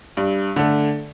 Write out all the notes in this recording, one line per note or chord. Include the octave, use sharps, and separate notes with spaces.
G2
D3 A3